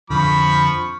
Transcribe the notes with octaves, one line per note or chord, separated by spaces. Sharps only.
F2 D3 F3 B5 C#6